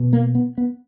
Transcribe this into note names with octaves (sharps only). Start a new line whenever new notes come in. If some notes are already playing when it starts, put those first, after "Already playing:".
Already playing: B2
A#3
B3
B3